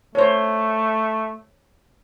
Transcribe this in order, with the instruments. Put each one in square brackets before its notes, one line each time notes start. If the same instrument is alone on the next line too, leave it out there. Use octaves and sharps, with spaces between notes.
[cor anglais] A3 [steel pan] C5 C#5